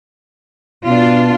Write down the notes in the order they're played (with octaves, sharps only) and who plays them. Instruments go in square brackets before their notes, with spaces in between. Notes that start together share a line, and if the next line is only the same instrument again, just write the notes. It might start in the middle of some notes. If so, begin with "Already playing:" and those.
[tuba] B2 [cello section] D4 F4